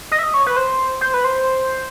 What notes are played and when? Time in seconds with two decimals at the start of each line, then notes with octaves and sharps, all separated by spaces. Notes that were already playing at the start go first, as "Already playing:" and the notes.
0.11 D#5
0.19 E5
0.23 D#5
0.34 C#5
0.46 B4
0.57 C5
1.01 C5
1.14 B4
1.24 C5